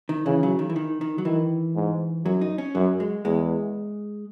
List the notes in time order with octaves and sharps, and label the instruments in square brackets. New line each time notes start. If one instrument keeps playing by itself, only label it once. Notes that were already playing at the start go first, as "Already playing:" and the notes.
[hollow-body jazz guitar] D#3
[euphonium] C#3 [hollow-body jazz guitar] E3
[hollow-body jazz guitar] F#3
D#3
E3
D#3
D#3
F#3
[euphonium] D#3 [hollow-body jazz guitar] E3
[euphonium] G#2
[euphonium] F#2 [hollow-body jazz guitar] F#3
[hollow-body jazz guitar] D#4
C#4
[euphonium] F#2 [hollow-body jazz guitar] F#3
[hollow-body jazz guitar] G#3
[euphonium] E2 [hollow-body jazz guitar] G#3